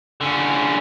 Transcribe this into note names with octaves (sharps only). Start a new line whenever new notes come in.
D3 C#4